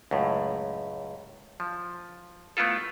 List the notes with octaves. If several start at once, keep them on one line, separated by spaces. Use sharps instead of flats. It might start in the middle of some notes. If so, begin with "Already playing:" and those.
C#2 F#2 A2
F3
A3 B3 E4 F4 A4